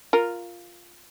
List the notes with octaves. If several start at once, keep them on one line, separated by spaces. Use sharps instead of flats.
F4 A#4